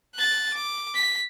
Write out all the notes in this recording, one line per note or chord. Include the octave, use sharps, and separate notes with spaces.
F#6 A6
D6
B6